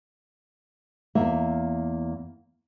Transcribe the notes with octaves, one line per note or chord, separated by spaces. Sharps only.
E2 A#3 E5